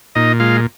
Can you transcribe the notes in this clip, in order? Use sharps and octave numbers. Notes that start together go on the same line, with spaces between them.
A#2 D#4 D#5
G#3 F4 F5